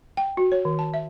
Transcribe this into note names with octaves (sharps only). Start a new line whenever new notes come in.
G5
F#4
C#5
D#3
A5
E5